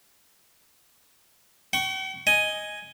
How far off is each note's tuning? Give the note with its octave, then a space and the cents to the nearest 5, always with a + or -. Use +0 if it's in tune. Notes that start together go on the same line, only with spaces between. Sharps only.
G5 -45 C#6 +0
D#5 +0 G#5 +0